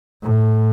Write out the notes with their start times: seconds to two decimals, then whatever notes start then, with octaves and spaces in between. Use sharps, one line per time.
0.24 A2